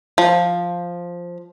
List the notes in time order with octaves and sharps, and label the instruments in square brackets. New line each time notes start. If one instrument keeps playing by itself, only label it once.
[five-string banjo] F3